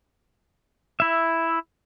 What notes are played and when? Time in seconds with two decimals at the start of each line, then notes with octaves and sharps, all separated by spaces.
1.00 E4 E5